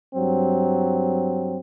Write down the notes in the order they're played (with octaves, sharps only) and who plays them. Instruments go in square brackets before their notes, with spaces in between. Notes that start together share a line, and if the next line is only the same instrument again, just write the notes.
[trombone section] G2 F#3 C4